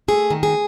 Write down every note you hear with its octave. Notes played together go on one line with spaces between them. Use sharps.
A3 G#4
D#3
G#4